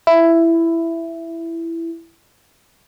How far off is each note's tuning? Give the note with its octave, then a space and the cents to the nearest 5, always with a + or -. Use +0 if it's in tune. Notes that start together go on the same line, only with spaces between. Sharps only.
E4 +10